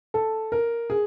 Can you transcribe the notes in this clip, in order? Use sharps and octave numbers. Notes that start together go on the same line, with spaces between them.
A4
A#4
G#4